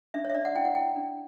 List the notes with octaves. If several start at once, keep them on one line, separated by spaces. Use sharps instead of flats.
D4 E5
C#5
E5
D4 D5
F#5
E4 G5
F#5
E4 G5
D4